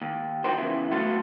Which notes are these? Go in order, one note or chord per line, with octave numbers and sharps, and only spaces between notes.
D#2
F3 D#4 F#4 G4 A#4 C5
C#3 E3 B3 E4
F#3 A3 B3 F4 F#4 A4